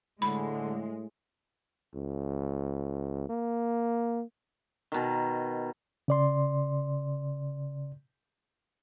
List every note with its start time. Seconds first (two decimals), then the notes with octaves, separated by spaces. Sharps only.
0.22 A2 D3 G#3 B5
1.95 C#2
3.29 A#3
4.92 B2 D#3
6.08 C#3 D5 C6